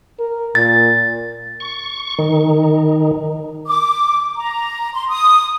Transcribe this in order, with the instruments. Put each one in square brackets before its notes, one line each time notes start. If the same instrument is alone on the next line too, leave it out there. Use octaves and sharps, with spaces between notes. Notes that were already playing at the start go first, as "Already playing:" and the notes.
[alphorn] A#4
[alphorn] A#2 [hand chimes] A6
[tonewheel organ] C#6
D#3
[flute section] D6
A#5
C6
D#6